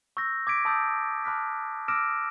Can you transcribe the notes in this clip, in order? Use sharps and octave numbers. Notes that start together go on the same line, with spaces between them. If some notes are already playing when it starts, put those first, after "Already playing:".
C#6 E6 G6 A#6
D6 G#6 B6 D7
A5 B5 D#6 E6 G6 A6
A5 B5 D6 F6 F#6 B6
D6 E6 F6 A#6 D7 E7